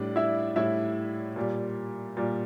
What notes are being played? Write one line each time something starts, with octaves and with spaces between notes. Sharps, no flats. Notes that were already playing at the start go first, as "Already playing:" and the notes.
Already playing: A2 G3 D4 D5
E4 E5
A2 G3 E4 E5
A#2 G3
A#2 G3